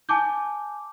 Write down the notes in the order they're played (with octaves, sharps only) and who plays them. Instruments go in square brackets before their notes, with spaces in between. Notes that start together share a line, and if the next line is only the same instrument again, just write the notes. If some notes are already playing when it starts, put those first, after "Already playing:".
[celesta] G#5 A5 D6 G6